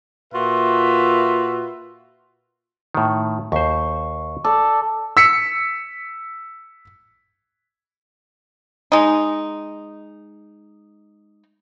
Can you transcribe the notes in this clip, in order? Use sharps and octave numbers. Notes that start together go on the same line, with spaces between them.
A#2 F4 F#4 B4 E5
A2 D#3
D#2 C5 C#6
A4 D5
E6 B6 C#7
G#3 D#4